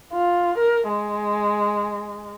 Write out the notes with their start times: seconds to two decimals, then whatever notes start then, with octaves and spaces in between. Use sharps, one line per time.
0.13 F4
0.58 A#4
0.89 G#3